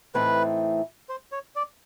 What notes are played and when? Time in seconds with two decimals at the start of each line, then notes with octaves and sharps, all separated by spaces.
0.14 A2 E3 A3 C4 D#4 B4
1.09 C5
1.32 C#5
1.56 D5